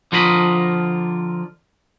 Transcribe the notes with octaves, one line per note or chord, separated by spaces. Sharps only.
D3 F3 F4 A#4 D#5 B5